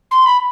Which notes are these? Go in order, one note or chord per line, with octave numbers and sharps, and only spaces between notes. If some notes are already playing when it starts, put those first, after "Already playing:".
C6
B5